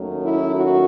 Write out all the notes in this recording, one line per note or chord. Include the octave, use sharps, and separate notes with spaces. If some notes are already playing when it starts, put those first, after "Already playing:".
Already playing: D#2 D#3 F#3 A3 C#4
E4
F#4